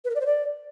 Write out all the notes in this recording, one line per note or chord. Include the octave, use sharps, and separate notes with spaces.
B4
A#4
D5
C5
D5